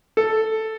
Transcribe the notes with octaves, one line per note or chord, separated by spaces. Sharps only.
A4